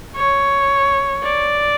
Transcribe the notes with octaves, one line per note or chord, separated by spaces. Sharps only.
C#5
D5